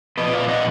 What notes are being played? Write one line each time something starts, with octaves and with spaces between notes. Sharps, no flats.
A#2 F3 B3 B4 D#5
D5 F5
D#5 F#5